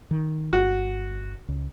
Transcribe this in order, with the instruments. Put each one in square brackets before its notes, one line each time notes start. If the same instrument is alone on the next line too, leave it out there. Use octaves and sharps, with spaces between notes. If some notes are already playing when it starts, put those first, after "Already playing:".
[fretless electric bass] D#3
[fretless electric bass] G1 [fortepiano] F#4
[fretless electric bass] C#2